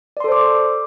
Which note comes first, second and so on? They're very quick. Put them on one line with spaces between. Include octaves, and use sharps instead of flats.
D5 C6 A4 C5 D6